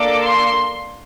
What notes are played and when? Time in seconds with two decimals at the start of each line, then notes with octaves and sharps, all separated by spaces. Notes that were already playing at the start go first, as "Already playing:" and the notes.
Already playing: A#3 D4 A4 D6
0.24 C6